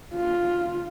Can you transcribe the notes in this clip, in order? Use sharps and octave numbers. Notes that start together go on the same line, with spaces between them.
F4